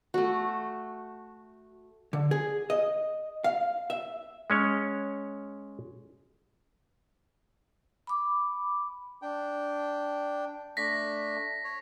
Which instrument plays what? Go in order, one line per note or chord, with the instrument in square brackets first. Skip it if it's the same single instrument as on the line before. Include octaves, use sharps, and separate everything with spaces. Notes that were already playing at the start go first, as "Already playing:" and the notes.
[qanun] A3 F#4
[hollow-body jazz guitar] D3
G#4
D#5
F5
E5
[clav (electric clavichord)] G#3 C#4 C#5
[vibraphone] B5 D6
[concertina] D4 G5
[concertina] A3 D4 [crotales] A#6 B6
[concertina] C#5